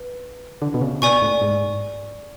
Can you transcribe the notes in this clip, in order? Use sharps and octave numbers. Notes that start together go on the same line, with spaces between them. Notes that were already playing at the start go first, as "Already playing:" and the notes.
Already playing: B4
D3
B2
C#3
B2 D5 G#5 C#6
A2
G#2